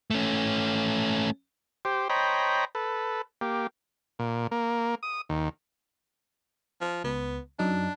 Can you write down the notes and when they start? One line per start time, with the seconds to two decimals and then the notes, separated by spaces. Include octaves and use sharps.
0.11 A3 C#4
1.85 G4 C5
2.10 C5 C#5 D#5 G5 A#5 B5
2.75 A4 B4
3.41 A#3 G4
4.19 A#2
4.51 A#3
5.03 D#6
5.30 D#2
6.81 F3
7.04 C#2 B3
7.59 F#2 F#3 D4 D#4